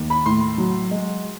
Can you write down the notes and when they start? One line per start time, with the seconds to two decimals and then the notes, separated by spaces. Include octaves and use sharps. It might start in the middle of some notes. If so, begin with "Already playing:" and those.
Already playing: D#2
0.10 B5
0.26 A2 C6
0.58 F#3
0.91 G#3